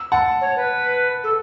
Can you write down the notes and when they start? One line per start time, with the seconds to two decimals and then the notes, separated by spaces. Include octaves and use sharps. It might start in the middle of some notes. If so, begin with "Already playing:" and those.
Already playing: E6
0.12 F#5 A5
0.41 C#5
0.56 B4
1.23 A4